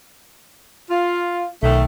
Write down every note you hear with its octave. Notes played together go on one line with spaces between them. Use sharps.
F4
B1 D#3 A3